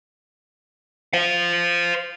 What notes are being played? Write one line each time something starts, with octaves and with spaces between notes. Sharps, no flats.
C5 F5